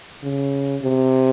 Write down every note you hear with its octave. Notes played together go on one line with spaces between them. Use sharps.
C#3
C3